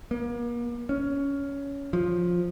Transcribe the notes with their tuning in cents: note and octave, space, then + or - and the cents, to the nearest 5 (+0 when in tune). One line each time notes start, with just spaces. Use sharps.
A#3 +40
C#4 +15
F3 +10